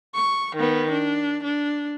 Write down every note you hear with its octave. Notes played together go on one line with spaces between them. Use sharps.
C#6
D#3 B3
D4
D4